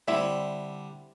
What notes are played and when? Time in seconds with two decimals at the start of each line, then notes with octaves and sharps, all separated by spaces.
0.08 D3 G3 C4 E4 E5